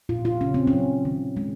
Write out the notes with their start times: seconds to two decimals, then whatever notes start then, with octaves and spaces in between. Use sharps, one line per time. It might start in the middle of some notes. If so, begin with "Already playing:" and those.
0.09 A#2 F4
0.25 F4
0.41 C#3 C#4
0.54 C4
0.67 C#4
0.73 F#3
1.05 D#3
1.37 G#3